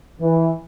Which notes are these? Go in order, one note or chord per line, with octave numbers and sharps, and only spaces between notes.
E3